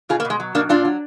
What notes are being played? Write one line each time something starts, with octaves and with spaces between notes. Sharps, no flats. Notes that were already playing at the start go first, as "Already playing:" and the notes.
B2 F4 G#4
A#3
B2
G#3
F#3
B2 A#3 D4
A#2 D4 F4
F#3